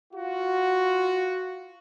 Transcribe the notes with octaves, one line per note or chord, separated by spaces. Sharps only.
F4 F#4